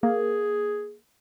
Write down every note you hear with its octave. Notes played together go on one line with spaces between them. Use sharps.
A#3 G#4